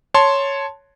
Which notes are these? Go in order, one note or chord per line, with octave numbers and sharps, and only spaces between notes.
C#5 A5 C6